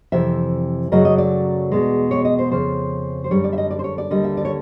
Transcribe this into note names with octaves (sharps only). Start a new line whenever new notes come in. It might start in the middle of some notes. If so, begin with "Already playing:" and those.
F2 C3 E3 E5
F#2 C#3 F#3 A3 D#5
D#5
D5
E2 B2 G#3
C#5
D#5
C5
F2 C#3 F3 C5
C5
F#2 D3 G3 C#5
D5
E5
D#5
D5
C5
C#5
D5
D#2 D3 G3 D#5
E5
D5
C#5